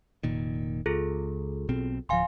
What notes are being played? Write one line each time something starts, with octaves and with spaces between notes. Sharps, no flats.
F1 A#2 D#3
C#2 F4 G#4 A4
B1 B2 C4
D1 F3 F5 G#5 C6